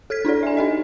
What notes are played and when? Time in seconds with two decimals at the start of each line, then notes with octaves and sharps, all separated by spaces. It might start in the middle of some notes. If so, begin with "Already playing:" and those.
0.10 A4 F6 G#6 B6
0.25 D4 E4 A4 D5
0.43 E5 G#5
0.57 D#4 A4 D#5